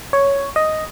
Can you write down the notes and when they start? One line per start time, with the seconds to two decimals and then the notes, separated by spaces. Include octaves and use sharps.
0.13 C#5
0.56 D#5